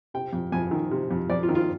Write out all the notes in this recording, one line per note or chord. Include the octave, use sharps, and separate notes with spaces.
C3 G5
F2
F2 G#5
D#3
C3
F2
F2 D5
F4
D#3
F4